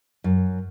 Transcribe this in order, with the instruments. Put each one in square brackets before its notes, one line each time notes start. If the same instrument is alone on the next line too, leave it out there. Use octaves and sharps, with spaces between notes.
[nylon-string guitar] F#2